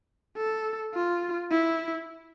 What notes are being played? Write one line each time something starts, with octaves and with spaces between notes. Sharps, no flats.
A4
F4
E4